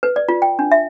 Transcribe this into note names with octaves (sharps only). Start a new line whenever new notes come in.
B4
D5
F4
G5
D4
E5